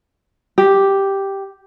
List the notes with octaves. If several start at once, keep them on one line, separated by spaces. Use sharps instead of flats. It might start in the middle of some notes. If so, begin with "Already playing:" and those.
G4